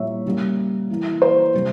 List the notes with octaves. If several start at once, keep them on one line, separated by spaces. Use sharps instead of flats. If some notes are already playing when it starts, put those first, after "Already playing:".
Already playing: A#2 G3 A#3 C#5 E5
C#3 G3 A#3
E3 A#3
C5
C3 G3 A#3